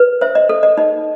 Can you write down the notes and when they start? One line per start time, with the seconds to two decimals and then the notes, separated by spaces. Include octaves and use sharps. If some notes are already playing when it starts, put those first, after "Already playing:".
Already playing: B4
0.21 C5 E5
0.35 D#5
0.49 A4
0.63 D#5
0.77 D#4 D#5